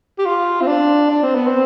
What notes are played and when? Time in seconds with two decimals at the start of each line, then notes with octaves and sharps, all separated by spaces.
0.19 G4
0.26 F4
0.61 C4
0.68 D4
1.10 D4
1.23 C4
1.35 B3
1.47 C4